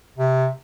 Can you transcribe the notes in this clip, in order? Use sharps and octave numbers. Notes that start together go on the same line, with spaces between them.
C3